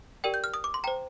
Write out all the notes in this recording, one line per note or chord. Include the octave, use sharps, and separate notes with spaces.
G4 A#4 D5 G5
G6
F6
D#6
D6
C6
C5 G5 A#5